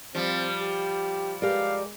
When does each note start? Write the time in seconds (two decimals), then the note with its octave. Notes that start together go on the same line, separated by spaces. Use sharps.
0.15 F3 G3 C4
0.62 G4
1.42 G#3 G4 A#4 D5 F5